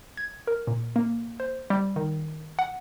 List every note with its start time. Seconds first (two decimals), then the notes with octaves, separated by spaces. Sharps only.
0.17 G#6
0.47 A#4
0.67 A#2
0.96 A#3
1.40 C5
1.70 G3
1.96 D#3
2.59 F#5